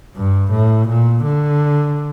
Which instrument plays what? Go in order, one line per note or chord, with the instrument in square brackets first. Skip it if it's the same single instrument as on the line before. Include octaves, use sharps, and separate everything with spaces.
[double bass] G2
A2
A#2
D3